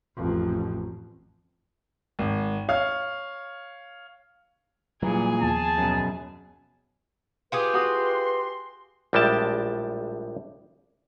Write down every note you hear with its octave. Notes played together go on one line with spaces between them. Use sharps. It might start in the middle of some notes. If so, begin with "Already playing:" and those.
A1 F2
G#1
C#5 F5 F6
A#2 E3 F#3 G3 G#4
D#2 F3 B3 A5
F#2 B2
F4 G4 G#4 B4
F#4 C6 D#6
A#1 A2 G3 G#3 G5 A5